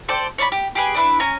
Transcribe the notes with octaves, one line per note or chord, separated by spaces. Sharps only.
A4 C5 D5 G5
C#5 D5 E5 B5
G4
G4 G#4 B4
D4 E4 B4
C#4 G#5 A#5